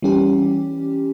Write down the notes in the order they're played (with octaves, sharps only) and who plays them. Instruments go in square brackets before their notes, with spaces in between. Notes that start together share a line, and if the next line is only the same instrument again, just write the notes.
[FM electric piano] E3 G3 C#4 G4